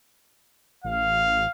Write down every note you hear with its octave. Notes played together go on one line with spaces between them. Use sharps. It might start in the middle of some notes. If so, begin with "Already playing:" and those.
A1 F5